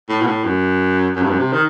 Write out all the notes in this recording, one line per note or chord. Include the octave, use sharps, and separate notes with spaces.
A2
B2
A2
F#2
F#2
G2
F#2
C3
D#3